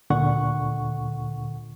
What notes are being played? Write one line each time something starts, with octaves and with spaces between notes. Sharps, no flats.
D2 A#2 D3 F#5 C#6